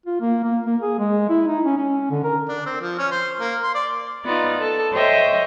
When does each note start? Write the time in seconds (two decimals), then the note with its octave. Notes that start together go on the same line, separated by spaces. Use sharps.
0.06 F4
0.21 A#3
0.44 A#3
0.66 A#3
0.82 G#4
0.99 G#3
1.30 E4
1.48 D#4
1.65 C#4
1.77 C#4
2.11 D3
2.24 A#4
2.49 D4
2.66 C4
2.81 F3
2.98 C#4
3.11 C5
3.40 A#3
3.63 C6
3.74 D5
4.25 B3 D#4 F4 D5
4.59 A4
4.95 C5 C#5 D#5 E5 G5